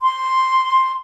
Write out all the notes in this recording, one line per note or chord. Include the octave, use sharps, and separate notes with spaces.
C6